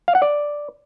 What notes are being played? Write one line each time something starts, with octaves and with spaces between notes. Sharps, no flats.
F5
F#5
D5